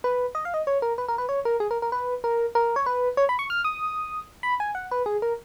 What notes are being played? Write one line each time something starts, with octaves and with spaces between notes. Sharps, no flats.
B4
D#5
F5
D#5
C#5
A#4
B4
A#4
B4
C#5
A#4
G#4
A#4
A#4
B4
A#4
A#4
C#5
B4
C#5
B5
C#6
F6
D#6
B5
G#5
F#5
B4
G#4
A#4